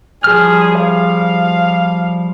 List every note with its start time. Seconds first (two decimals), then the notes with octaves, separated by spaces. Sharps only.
0.24 F3 G3 G#4 F6
0.81 F5